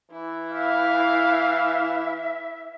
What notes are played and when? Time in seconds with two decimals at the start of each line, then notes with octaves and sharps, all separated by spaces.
0.11 E3 E4
0.52 E5 F5